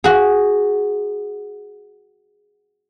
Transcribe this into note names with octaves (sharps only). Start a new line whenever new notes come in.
F#4 G#4